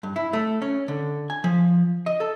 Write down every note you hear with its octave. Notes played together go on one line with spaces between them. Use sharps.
G2
E4
A3
C#4
D3
G#5
F3
D#5
A4